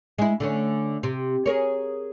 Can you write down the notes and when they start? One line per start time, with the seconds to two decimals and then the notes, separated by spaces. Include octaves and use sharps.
0.18 G#3 E4
0.40 D3 A3 C#4
1.03 C3
1.46 G#4 A#4 C#5